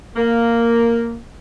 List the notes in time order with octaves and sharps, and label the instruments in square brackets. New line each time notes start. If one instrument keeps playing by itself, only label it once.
[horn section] A#3